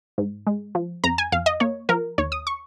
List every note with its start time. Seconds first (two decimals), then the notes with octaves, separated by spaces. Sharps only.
0.18 G#2
0.47 G#3
0.75 F3
1.04 F2 A#5
1.18 G#5
1.32 F2 F5
1.46 D#5
1.60 A#3 C#5
1.89 F3 A#4
2.18 D#2 C#5
2.32 D#6
2.47 C#6